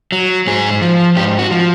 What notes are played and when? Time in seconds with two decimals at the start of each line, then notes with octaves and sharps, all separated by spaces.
0.12 F#3
0.47 G#2 G#4
0.82 F3
1.16 G#2 G4
1.39 F#4
1.51 F3